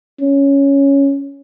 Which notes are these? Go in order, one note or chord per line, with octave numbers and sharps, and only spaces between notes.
C#4